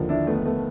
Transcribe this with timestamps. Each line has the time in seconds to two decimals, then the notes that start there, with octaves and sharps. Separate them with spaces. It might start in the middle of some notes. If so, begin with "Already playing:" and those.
Already playing: D#2 D3 F3
0.09 D4 E4
0.27 A3 B3
0.45 A3 B3